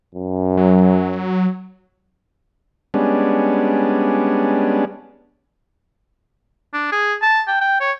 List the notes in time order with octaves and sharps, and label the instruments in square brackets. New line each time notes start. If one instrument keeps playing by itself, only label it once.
[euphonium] F#2
[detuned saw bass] F#3
[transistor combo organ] G3 G#3 B3 C#4 D4
[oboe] D4
G#4
A5
G5
G5
C#5